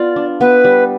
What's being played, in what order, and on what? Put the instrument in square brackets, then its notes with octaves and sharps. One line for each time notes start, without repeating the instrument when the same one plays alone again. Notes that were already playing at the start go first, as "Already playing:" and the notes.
Already playing: [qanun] B3 F4 [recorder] D5
[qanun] D4
[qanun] B3 [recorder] B4
[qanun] G3